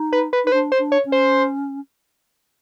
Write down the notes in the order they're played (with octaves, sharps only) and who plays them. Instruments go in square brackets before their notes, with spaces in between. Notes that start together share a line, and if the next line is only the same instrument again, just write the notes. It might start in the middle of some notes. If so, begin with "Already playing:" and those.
Already playing: [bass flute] D#4
[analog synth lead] B4
B4
[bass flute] D#4 [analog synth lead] B4
[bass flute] D4 [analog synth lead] C5
[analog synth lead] C5
[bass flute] D4
[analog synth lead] C#5
[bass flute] C#4
[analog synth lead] C5